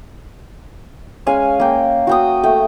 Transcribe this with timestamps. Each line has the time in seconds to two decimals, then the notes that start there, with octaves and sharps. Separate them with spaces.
1.27 G#3 C#4 F5 G#5
1.60 A#3 G5
2.07 F#4 G5 D#6
2.43 A3 G5